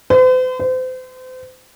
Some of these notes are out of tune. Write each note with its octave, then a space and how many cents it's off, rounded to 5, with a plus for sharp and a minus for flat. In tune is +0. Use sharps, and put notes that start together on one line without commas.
C5 -45
C5 -35